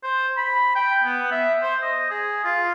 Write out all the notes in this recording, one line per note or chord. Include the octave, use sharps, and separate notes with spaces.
C5
B5
G5
B3
E5
C5
D#5
G#4
F4